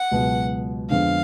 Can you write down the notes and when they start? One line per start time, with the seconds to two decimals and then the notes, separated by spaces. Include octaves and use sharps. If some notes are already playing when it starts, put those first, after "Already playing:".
Already playing: F#5
0.12 C#2 B2 F#3
0.90 F2 D3 G#3 B3 D4 F5